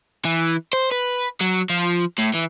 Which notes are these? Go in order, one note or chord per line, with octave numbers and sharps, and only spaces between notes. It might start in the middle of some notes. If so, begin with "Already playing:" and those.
E3
C5
B4
F#3
F3
A2
E3